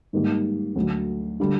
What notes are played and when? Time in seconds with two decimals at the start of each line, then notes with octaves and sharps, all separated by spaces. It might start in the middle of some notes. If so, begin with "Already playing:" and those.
0.13 G#2 D#3 G3 A#3
0.76 D2 D3 F#3
1.40 D3 G3